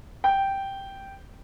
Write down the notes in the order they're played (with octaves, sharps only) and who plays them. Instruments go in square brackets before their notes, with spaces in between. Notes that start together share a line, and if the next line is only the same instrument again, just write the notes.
[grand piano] G5